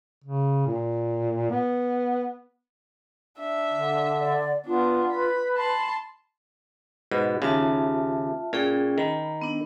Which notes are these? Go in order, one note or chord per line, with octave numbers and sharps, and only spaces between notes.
C#3
A#2
B3
D4 E5
D3
D5
B3 D4 F4
B4 B5
A5 B5 C6
G#2 B2 B5
D#2 C#3 F4 E5 A5
A#2 C#4 G#4 G5
D#3 A#5 B5
B3 D4